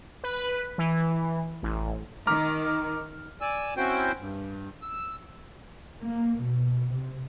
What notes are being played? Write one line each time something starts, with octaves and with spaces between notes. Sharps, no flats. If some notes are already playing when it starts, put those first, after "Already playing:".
B4
E3
A1
D#3 A#5 D6 F6
D5 G#5 E6
C4 C#4 E4 F#4 C5 G5
G2
E6
A#3
B2
C3